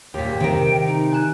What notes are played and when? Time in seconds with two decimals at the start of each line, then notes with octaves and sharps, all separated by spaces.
0.14 D#2 A#2 G4 B6
0.40 C3 D#3 A#4 G5
0.86 D#4
1.12 G#5 F#6 E7